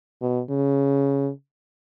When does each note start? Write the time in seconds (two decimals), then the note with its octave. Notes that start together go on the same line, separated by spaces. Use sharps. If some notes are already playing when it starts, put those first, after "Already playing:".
0.22 B2
0.50 C#3